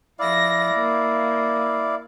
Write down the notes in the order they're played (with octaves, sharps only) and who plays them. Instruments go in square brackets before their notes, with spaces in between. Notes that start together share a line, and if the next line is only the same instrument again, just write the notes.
[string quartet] F3 A#6 [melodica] E4 D5 F5
[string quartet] A#3